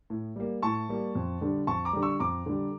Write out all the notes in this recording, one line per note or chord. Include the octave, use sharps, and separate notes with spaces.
A2
G3 A#3
A2 A5 C#6
G3 A#3
F2
D3 G3
F2 A5 C#6
A#5 D6
D3 G3
C#6 E6
F2 A#5 D6
D3 G3